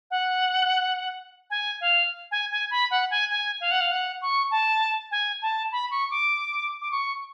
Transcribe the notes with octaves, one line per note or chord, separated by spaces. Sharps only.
F#5
G#5
F5
G#5
G#5
B5
F#5
G#5
G#5
F5
F#5
F5
F#5
C#6
A5
G#5
A5
B5
C#6
D6
D6
C#6